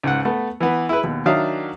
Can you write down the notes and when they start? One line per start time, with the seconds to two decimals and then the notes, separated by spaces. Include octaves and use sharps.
0.03 C#2 G#2 F#5
0.25 A3 B3
0.60 E3 B3
0.89 E4 G#4 B4
1.03 D#2 B2
1.26 D#3 F#3 D4 E5 F5 D#6